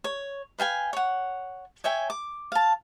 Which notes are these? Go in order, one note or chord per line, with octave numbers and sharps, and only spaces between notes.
C#5
B4 F5 G5 G#5
C#5 F#5
C#5 E5 G5 G#5
D6
F5 A5